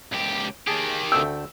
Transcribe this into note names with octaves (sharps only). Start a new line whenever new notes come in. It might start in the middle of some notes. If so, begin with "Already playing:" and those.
C#2 G4
D#3 G4 G#4 A5
D2 A3 G5 E6